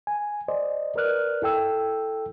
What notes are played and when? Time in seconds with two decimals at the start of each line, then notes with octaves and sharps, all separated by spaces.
0.07 G#5
0.48 C5 D5 D#5
0.95 A#4 B4 D5 F6 F#6
1.42 E4 A4 G5 E6